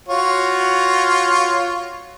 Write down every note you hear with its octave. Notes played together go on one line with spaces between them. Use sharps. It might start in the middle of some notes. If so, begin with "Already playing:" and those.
F4 F#4 C#5